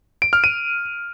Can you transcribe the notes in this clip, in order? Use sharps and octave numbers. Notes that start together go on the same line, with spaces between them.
D7
F6
D#7